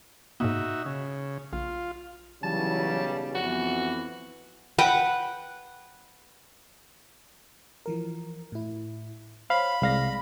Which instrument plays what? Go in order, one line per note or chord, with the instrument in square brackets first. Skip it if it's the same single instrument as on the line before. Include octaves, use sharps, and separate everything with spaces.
[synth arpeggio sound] G#2 B2 A#3 [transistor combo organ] D#4 F#4 E5
[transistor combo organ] C#3
[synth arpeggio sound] A#1 [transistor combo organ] F4
[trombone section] B1 C#3 G3 [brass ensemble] E3 F#3 [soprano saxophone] A5
[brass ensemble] F2 E3 B3 [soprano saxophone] F#4
[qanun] B4 F#5 G5
[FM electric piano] E3 F3 A#4
A2 E4
[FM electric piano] C5 C#5 [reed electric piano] F5 [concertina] B5
[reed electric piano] C2 F5 [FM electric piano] G#3 D5 A#6